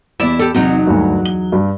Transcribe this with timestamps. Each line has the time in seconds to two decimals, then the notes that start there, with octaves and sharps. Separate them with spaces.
0.20 E2 E4 D5 E7
0.39 G4 A4
0.55 E2 C3 F#3 D#4
0.87 D2 G2
1.26 G7
1.52 G2